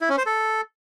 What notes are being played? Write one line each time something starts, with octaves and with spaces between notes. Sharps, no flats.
E4
C#4
C5
A4